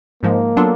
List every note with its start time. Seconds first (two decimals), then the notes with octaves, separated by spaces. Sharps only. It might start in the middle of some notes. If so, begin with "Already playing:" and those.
0.23 G#2 F3 G#3 A#3
0.57 F#3 B3 D4 F4 A4